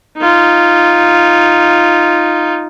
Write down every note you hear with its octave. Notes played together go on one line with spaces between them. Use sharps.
D#4 F4